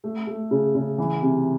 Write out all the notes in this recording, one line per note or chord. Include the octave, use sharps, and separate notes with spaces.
A3
A3
C#3
C#3
E3
C3